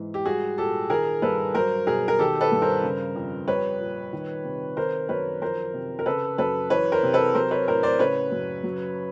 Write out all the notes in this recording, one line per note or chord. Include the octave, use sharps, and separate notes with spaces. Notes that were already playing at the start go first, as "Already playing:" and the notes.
Already playing: G#2 E3
G4
G3 F#4 G#4
A#2 G4 A4
D#3 G#4 A#4
G2 A4 B4
F#3 A#4 C5
B2 G#4 A#4
A#4
D#3 G4 A4
A4 B4
G2
A#4 C5
C#3
F2
G3 B4 C#5
A#2
D#3
C3
D#3 A#4 C5
F#2 B4 C#5
F3 A#4 C5
C3
A#4
C#3 A4 B4
F#2 A4 B4
E3 B4 C#5
A#4 C5
C3
A4 B4
F#3 A#4 C5
B4 C#5
A2 A#4 C5
C5 D5
C#3 B4 C#5
F#2
F#3